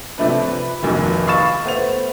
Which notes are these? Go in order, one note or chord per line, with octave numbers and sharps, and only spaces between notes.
C3 F3 A3 D4 B4
B4
F1 D2 A#2 D#3
F5 B5 C#6 A6 E7
A3 B3 C5 F7